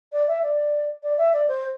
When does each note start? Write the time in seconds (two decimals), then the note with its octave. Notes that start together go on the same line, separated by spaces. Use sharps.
0.12 D5
0.28 E5
0.43 D5
1.03 D5
1.18 E5
1.33 D5
1.48 C5